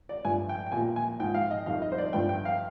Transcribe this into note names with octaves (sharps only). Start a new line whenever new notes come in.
D5
G2 F3 G#5
G5
G5
A#2 F3 G#5
G#5
G#2 F3 G5
F5
D#5
F2 D#3 G3 F5
D#5
C5
D5
G2 F3 G5
G5
F5